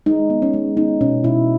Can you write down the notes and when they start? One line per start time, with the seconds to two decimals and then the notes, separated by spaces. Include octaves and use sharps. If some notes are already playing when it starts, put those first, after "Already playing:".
0.06 G#3 D#4
0.30 B3
0.42 C#4
0.54 G#3
0.77 B3 D#4
1.01 B2 C#4
1.24 B2 E4